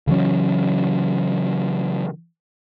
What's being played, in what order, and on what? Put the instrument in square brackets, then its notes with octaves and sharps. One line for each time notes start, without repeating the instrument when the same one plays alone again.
[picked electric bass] C#3 E3 F#3 C#4